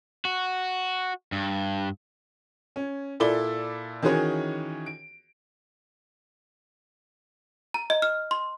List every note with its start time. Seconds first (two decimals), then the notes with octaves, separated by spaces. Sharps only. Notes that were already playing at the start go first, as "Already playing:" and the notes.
0.25 F#4
1.32 G2
2.76 C#4
3.20 A#2 E4 A4 D5 G7
4.02 D#3 E3 C#4 F#4 G#4 C#5
4.86 D7
7.74 A#5
7.90 D#5
8.02 F6
8.31 C6